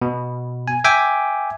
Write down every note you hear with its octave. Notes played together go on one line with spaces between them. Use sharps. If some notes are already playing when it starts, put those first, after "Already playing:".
B2
G#5
E5 G5 G#5 D6